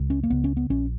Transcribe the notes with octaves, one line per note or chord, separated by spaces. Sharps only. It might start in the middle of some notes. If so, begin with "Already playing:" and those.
Already playing: C#2 C#3
C#4
A#3
C#2 C#3 B3
C#4
B3
A#1 A#2 C#4